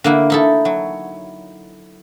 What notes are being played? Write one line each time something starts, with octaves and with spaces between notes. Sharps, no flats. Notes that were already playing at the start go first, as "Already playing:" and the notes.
D3 A#3 E4
D#4 E4 A4
F#3